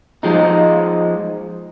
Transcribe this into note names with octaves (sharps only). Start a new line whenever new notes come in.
F3 G#3 D#4